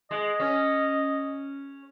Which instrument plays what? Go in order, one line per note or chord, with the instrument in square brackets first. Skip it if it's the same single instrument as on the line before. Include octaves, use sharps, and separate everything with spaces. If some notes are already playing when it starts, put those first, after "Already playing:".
[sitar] G#3 [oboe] D#5
[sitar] C#4